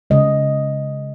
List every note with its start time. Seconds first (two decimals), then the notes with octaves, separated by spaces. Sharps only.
0.10 C#3 G#3 D#5